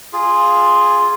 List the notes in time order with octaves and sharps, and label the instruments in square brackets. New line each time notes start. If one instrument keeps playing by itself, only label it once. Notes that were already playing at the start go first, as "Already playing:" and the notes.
[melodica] F4 G#4